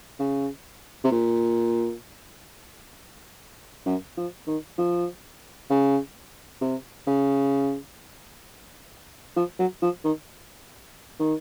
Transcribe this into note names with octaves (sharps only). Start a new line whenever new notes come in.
C#3
C3
A#2
F#2
F3
D#3
F3
C#3
C3
C#3
F3
F#3
F3
D#3
D#3